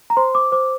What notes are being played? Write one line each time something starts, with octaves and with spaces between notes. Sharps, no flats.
A#5
C5 C6
D6
C5 D6